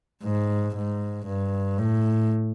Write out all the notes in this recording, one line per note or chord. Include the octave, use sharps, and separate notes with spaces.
G#2
G#2
G2
A2